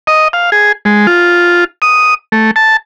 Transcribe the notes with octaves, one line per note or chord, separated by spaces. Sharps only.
D#5
F5
G#4
G#3
F4
D#6
A3
A5